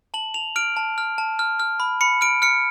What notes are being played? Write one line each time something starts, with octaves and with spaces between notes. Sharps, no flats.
A5 F#7
A5 F7
F6 D7
A5
F6
A5
F6
F6
B5
B5 C#7
F6 D7
F6 C#7